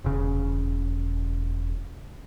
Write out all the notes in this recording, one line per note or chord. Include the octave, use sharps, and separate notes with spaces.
E1 C#3